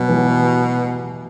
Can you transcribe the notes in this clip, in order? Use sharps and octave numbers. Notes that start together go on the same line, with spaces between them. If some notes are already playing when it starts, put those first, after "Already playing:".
Already playing: B2 F#3
E3
F#3